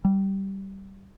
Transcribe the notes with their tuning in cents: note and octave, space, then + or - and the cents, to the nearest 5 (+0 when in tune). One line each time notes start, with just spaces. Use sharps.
G3 -15